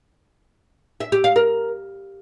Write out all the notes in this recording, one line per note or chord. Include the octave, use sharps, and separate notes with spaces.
E5
G4
F5
A#4